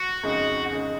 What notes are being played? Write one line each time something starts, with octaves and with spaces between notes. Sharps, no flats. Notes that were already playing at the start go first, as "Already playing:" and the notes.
Already playing: F#4
F2 C#3 G#3 D#4 G#4
C#3 G#3 D#4 G#4